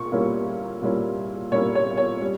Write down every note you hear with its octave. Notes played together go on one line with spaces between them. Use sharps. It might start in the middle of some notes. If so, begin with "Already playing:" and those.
Already playing: A#2 C#6
A#2 G3 A#3 C#4 E4
A#2 G3 A#3 C#4 E4
A#2 G3 A#3 C#4 E4 C#5
C#5
C#5
G3 C#4